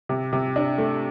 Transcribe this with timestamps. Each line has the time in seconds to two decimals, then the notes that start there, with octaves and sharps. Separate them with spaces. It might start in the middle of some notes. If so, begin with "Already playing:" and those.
0.09 C3
0.33 C3
0.56 D4
0.78 A3